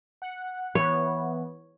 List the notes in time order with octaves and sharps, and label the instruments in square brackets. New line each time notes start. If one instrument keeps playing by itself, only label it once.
[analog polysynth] F#5
[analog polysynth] E3 B3 [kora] C#5